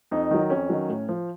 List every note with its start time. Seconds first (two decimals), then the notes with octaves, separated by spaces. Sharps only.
0.11 F2 D#4
0.31 D#3 F#3
0.50 F2 C#4
0.69 D#3 F#3
0.89 A2
1.09 F3